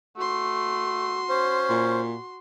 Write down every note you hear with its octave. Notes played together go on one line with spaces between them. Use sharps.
A3 F#4 C6
C#4 C5
A#2